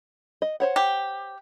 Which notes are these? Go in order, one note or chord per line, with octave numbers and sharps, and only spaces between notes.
D#5
C5 C#5 F#5
G4